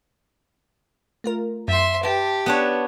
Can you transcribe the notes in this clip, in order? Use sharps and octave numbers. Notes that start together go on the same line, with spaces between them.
A3 F4 A#4
F#2 E5 C6
G4 B4 G5 A5
B3 D4 C#5